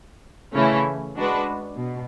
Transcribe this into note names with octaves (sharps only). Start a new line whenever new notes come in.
C#3 E3 A3 C#4 E4
G#3 D4 F#4 B4
B2